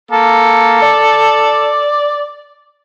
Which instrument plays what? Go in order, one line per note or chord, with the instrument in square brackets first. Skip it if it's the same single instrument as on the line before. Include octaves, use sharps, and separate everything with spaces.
[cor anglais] A#3 [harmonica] A4
[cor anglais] D5